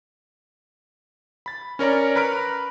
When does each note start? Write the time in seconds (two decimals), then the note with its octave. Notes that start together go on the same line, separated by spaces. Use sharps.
1.46 B5 A6
1.79 C#4 A#4 C#5 D5 A#5
2.16 B4 A#5 B5 F6 D7